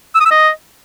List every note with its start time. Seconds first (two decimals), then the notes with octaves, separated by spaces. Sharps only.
0.15 E6
0.20 D#6
0.26 E6
0.31 D#5